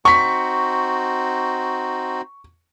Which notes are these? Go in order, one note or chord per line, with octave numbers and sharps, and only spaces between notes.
C4 D#4 F#4 C#6 B6